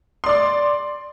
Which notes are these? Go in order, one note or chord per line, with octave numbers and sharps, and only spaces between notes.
D5 C6 D6